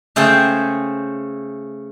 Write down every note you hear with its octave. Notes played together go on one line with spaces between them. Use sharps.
C#3 A3 G#4 C5 G5 A5